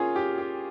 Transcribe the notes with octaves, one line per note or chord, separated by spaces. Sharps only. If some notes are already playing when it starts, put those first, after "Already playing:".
Already playing: A#3 C#4 F4 G#4
G4
G4